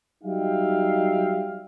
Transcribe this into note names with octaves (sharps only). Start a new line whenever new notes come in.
F#3 G3 D#4 E5 F5 G5